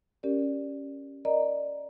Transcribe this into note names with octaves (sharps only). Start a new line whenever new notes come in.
C#4 G4 A#4 D5
A#4 D5 D#5 A#5